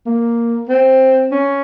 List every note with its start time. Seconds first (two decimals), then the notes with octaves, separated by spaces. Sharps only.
0.06 A#3
0.69 C4
1.31 C#4